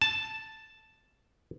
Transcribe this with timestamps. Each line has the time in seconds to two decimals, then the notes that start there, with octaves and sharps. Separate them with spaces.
0.02 A5